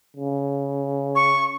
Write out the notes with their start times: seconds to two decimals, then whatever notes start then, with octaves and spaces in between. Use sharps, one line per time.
0.17 C#3
1.15 C#6